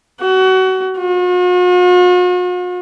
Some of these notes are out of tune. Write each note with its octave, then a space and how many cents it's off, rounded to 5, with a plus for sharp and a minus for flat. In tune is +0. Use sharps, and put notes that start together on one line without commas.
F#4 +25
F#4 -45